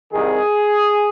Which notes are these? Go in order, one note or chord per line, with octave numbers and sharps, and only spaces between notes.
C2 C3 D#3 G#4